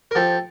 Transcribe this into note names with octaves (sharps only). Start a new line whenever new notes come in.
A#4
F3 G4 A4